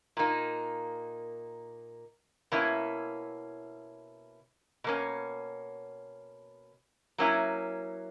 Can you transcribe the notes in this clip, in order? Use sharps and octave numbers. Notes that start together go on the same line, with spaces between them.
A#2 A#3 D#4
B2 A#3 C#4 E4
B2 A#3 C#4
F#3 A#3 C#4 E4